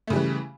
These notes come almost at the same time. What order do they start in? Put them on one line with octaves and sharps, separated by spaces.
A3 C#3 G3 E3